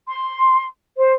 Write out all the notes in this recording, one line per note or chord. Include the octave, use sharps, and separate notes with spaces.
C6
C5